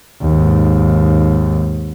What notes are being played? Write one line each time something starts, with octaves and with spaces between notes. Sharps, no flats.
D#2 G#2